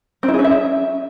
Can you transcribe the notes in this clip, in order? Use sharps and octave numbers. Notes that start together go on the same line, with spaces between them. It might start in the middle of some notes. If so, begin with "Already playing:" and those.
C4
E4
G#4
C#4
E5